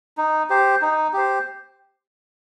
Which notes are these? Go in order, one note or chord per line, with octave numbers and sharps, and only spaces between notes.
D#4
G4 C5
D#4
G4 C5